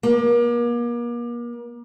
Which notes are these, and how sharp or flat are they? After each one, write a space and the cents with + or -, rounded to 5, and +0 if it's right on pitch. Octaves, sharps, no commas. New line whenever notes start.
A#3 +40